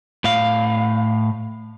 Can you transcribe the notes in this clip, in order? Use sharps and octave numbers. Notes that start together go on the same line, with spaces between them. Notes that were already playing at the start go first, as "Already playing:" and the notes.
A2 F5